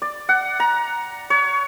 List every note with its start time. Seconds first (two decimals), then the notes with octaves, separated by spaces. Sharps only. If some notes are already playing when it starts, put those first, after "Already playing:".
0.02 D5
0.29 F#5
0.60 A#5
1.30 C#5